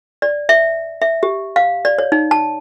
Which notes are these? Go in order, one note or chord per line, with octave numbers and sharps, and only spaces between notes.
D5
E5
E5
G4
F5
D5
C#5
D#4
A5